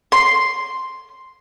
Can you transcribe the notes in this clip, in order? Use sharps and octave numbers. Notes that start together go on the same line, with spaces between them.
C6